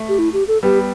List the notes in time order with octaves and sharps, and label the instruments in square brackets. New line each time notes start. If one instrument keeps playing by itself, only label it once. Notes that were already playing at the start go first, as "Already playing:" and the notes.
Already playing: [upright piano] A3
[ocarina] G4
E4
G4
A4
[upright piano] G3 B3 [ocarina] G4